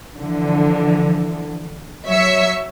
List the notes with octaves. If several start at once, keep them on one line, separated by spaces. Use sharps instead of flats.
D3 E3 F3
F#3 C#5 E5 E6 C#7